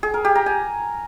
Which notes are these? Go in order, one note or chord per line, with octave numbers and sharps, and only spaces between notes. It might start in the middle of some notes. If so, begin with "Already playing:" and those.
G#4
A#4
G4
A#5
G#5